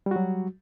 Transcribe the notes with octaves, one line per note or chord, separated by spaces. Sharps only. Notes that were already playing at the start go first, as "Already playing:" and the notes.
F#3 G3 F#4